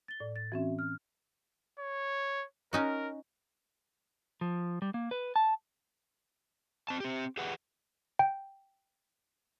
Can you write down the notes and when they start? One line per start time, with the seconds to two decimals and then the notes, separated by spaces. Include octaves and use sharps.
0.08 A6 G7
0.20 A2 D5
0.36 A6
0.52 E3 C4 C#4 F#4 E5
0.79 F6
1.79 C#5
2.73 C#4 D#4 F#4 A#4
4.41 F3
4.82 G3
4.94 A#3
5.11 B4
5.36 A5
6.89 C4 A5
7.00 C4 G4
7.38 G4 G#4 B4 F#5
8.19 G5